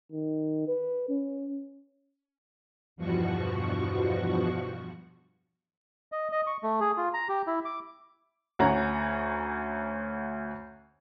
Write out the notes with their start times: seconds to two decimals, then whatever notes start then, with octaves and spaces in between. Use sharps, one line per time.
0.12 D#3
0.68 B4
1.09 C#4
2.96 E2 G2 B2 F3 F#4 C#6
6.12 D#5
6.32 D#5
6.47 C#6
6.63 A3
6.80 G#4
6.97 F4
7.14 A#5
7.29 G4
7.47 E4
7.65 D6
8.59 D2 C#4 F#5 A#5